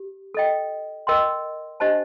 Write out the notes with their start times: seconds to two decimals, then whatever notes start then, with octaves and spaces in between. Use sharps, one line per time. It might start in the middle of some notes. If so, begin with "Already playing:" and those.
Already playing: G4
0.35 A4 D#5 G5
1.07 A#4 D#5 G5 C6
1.80 D4 G4 C5 D#5 A5